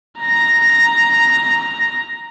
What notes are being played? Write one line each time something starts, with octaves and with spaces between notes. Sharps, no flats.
A#5 A#6